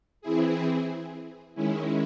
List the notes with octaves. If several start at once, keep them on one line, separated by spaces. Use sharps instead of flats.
E3 C4 E4 G#4
D#3 G#3 C#4 E4